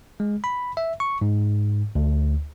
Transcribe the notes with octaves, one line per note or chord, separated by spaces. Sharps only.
G#3
B5
E5
C#6
G#2
D2